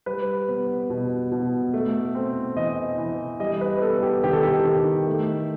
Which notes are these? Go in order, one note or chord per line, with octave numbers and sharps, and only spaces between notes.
G3 B4
B3
B2
B2
A3
C4
E3 D#5
E3
G3 D#5
B4
B3 A4
G4
D#3 G4
A4
G4
D#3
A3